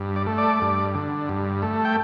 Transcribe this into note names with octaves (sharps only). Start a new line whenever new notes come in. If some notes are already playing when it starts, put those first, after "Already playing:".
Already playing: G2
D5
A3
D5
G2
D3
G2
A3
G5